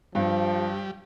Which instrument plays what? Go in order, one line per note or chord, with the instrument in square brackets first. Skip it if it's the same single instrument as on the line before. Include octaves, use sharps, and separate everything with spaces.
[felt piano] G2 [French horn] F3 [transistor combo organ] G3